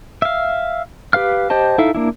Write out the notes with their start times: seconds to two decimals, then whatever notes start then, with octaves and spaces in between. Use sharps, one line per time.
0.22 E5 F5
1.13 G4 B4 F5 F6
1.50 G4 C5 D#5 A5
1.78 D#4 E4 A4 E5 F5
1.95 A#3 D4 E4